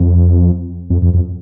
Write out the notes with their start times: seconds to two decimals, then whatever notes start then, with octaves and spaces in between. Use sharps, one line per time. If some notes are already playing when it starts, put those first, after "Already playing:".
Already playing: F2
0.90 F2
1.02 F2
1.14 F2